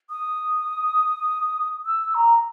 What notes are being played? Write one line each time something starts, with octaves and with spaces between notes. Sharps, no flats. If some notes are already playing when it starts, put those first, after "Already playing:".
D#6
E6
A#5